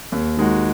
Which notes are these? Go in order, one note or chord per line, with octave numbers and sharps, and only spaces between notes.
D#2
D#3 G#3 D#4 F#4